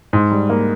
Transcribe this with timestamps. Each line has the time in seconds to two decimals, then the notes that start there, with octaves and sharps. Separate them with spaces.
0.13 G#2
0.31 G3
0.49 A#3